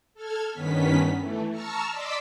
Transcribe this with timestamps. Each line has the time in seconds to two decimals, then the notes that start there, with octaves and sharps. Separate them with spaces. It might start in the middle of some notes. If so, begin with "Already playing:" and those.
0.14 A4 F6 G#6
0.51 G2 D#3 B3 C#4 B6
1.18 E3 A3
1.50 A5 A#5 C#6 E6 F6
1.89 D5 D#5 C6 D6 E6 B6